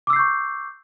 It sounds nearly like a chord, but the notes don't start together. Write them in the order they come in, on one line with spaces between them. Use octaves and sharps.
D6 E6 C7 G6 C#6